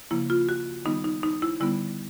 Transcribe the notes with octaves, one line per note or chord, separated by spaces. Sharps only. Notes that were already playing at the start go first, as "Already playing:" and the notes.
C#3 F3 A#3 E4
F4
F#4
D#3 G3 B3 D#4
D#4
D#4
E4
D3 G3 B3 E4